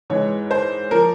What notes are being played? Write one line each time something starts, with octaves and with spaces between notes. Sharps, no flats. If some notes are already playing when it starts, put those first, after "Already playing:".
G#2 E3 G#3 C#5
C5
F3 A#3 A#4